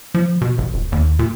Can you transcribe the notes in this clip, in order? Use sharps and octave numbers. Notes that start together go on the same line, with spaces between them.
F3
B2
A1
D#1
D#2
A#2